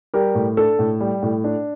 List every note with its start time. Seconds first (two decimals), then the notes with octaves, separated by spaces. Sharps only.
0.14 G3 G4 A#4
0.35 A2
0.57 D4 A4
0.79 A2
1.01 G3
1.23 A2
1.44 D4